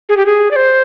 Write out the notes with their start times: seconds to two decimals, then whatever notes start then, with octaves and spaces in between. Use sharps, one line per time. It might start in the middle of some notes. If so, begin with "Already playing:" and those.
0.09 G#4
0.17 G4
0.26 G#4
0.51 D5
0.56 C5